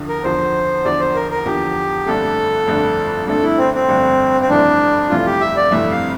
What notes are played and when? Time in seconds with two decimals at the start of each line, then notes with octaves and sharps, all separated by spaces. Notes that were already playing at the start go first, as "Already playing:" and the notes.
Already playing: E2 D3 F3
0.09 A#4
0.24 E2 D3 F3 C5
0.85 E2 D3 F3 D5
1.00 C5
1.15 A#4
1.31 A#4
1.45 E2 D3 F3 G4
2.06 G1 F2 D3 A3 D4 A4
2.67 G1 F2 D3 A3 D4
3.27 G1 F2 D3 A3 D4 A4
3.43 E4
3.58 C4
3.74 C4
3.89 G1 F2 D3 A3 D4
4.41 C4
4.50 G1 F2 C3 E3 A3 D4
5.10 G1 F2 C3 E3 A3 F4
5.26 G4
5.41 E5
5.56 D5
5.71 G1 F2 C3 E3 A3 E5
5.92 F5